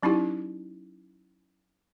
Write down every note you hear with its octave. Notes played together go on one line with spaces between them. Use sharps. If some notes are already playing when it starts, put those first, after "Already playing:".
F#3 C#4 D#4 E4 G4